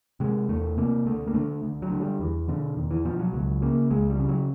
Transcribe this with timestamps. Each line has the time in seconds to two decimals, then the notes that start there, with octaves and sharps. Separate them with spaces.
0.20 C3 G#3
0.49 E2 A3
0.77 C3 A#3
1.06 D2 A3
1.27 A#3
1.34 D3 A3
1.63 D2
1.82 F#3
1.91 D3
2.01 G3
2.20 E2 E3
2.48 B2 D3
2.76 E2 D#3
2.91 E3
3.05 B2 F3
3.19 F#3
3.33 C#2 F#3
3.62 C#3 A#3
3.91 C#2 G#3
4.10 G3
4.19 C#3
4.29 F#3